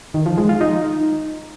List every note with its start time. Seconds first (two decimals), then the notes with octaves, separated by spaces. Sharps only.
0.14 D#3
0.26 F3
0.38 G#3
0.49 F4
0.61 D#4